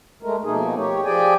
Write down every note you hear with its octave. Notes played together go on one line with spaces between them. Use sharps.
G#3 A3 A#4
F2 B2 A3 A#3 D#4 G#4
G4 C#5
F3 G4 G#4 D5 G5 G#5